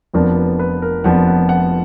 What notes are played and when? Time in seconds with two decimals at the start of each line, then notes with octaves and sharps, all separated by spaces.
0.14 F1 F2 F3 B3 D4 A#4
0.37 B4
0.59 B4
0.82 A#4
1.04 F1 F2 F3 B3 D4 F#5
1.28 F#5
1.49 F#5